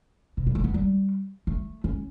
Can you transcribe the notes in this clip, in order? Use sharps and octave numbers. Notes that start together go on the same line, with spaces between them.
B2
G3
A3
B3
G3
A3
C#4